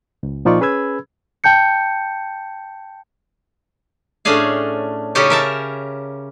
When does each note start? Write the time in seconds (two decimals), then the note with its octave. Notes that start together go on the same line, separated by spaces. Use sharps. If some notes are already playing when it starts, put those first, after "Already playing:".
0.23 C#2
0.45 A#2 F3 D#4 F4 D5 C#6
0.60 C#4 G#4 B4 B5 E6 G#6
1.44 G5 A5 G6 C#7
4.25 A2 A3 C#4 D4 G#4 F5
5.15 C#3 C#4 D#4 G4 A4 C#5
5.30 A#4 E5 A5